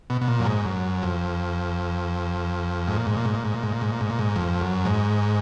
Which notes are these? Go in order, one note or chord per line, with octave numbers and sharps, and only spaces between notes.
B2
B2
A#2
F#2
G#2
F#2
F2
G#2
A#2
G#2
A#2
G#2
A#2
G#2
A#2
G#2
A#2
G#2
A#2
G#2
A#2
G#2
F2
F#2
G#2